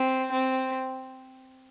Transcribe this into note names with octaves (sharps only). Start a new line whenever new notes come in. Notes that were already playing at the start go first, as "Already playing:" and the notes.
Already playing: C4
C4